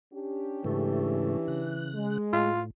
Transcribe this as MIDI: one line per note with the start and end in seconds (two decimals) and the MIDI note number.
0.14 1.70 61
0.14 1.70 62
0.14 1.70 67
0.64 1.37 44
0.64 1.37 49
0.64 1.97 52
0.64 1.37 57
1.48 2.18 49
1.48 2.18 90
1.95 2.51 56
2.33 2.71 45
2.33 2.61 65